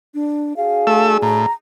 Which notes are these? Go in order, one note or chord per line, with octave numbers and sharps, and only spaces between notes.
D4
D4 F#4 G#4 F5
A3 E6
A2 A#5